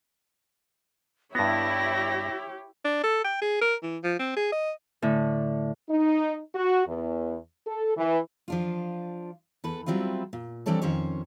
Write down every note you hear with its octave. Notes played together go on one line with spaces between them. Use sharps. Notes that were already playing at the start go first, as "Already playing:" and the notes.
G2 B3 E4 G4 C#5 A#6
D4
A4
G5
G#4
A#4
E3
F3
C4
G#4
D#5
A2 D3
D#4
F#4
E2
A4
E3
F3 D4 F4
E2 A4 B4
F#3 G3 C4 E4 F4
A#2
E3 G3 C4 D4 A4 C#5
F2 D#3 C#4 C5 C#5